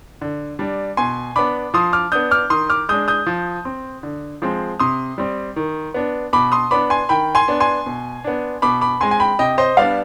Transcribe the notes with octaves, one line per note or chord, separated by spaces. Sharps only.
D3
G3 D4
B2 G#5 C6
B3 D4 B5 D6
F3 C6 D#6
D6 F6
B3 D4 D#6 G6
D6 F6
D#3 C6 D#6
D6 F6
G#3 D4 D#6 G6
D#6 G6
F3
C4
D3
F3 G#3 C4
C3 C6 D#6
G3 C4
D#3
B3 D4
B2 B5 D6
C6 D#6
B3 D4 B5 D6
G#5 C6
D#3 G5 B5
G#5 C6
B3 D4
G#5 C6
B2
B3 D4
B2 B5 D6
B5 D6
G#3 C4 G#5 C6
G#5
G5 B5
C3 D#5 G5
C5 D#5
G3 B3 D4 D5 F5